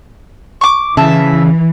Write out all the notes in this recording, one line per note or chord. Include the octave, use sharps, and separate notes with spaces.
C#6 D6
C#3 E3 E5 A5